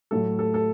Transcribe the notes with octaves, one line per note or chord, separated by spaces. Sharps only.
A2 F#3 A3 A4
A4
A4